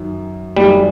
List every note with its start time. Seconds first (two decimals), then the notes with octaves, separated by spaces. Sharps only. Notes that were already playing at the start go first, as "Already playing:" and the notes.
Already playing: F#2 D#3
0.57 F#2 D#3 G3 G#3